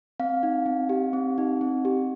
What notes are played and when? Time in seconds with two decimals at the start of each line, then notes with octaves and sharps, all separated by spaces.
0.20 C4 F5
0.43 D#4
0.66 C4
0.89 G4
1.13 C4
1.38 D#4
1.61 C4
1.85 G4